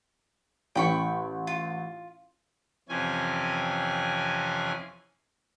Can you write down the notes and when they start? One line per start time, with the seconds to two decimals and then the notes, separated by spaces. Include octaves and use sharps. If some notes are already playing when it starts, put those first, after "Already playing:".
0.75 A1 G5 B5 C#6
1.47 F4
2.89 F2 C3 E3 C#4 G#5